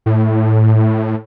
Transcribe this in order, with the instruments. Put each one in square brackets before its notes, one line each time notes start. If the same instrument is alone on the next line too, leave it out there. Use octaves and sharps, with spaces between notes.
[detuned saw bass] A2